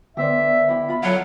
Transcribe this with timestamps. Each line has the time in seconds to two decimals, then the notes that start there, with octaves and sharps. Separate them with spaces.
0.17 D3 B3 G4 C5 D5 E5
0.69 E4 G4
0.89 F4 B5
1.03 F#3 F4 A4 F5 F#5